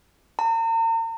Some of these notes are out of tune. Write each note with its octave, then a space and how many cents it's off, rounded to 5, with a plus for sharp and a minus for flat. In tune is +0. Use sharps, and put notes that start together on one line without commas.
A#5 -40